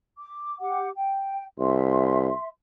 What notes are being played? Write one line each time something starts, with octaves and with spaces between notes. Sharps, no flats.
D6
G4 F#5 D6
G5
C2 E5 C6